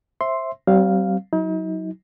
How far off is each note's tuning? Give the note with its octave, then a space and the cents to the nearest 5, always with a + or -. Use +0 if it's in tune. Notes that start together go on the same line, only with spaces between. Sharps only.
C5 +25 E5 +0 C6 +0
G3 -40 C4 +0 F5 +0
F#3 +0 D#4 +40